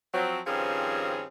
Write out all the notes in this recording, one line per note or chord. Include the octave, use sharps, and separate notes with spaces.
F3 F#3 C4
G2 D#3 F3 C4 C#4 G#4